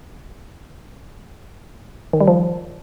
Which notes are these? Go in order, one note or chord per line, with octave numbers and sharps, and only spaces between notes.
D#3
G3
F3